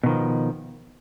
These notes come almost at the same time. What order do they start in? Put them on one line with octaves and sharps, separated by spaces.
B2 D#3 F3